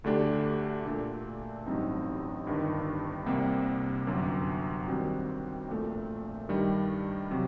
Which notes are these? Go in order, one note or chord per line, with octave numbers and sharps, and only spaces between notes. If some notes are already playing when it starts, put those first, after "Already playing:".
D2 D3 A3 D4 G4
A#2 A3 D4 A4
A1 G2 F#3 C4 D#4
G1 G2 D#3
C2 C3 G3 A#3
G1 F#2 F#3
D#2 D#3 G3 C4 F#4
A#1 A#2 A3
G2 D#3 G3
C3 F#3